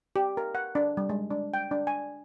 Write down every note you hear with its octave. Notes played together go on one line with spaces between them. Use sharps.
G4
A#4
F#5
D4
G3
G#3
D4
G5
D4
G#5